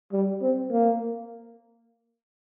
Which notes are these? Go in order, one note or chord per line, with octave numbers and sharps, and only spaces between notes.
G3
C4
A#3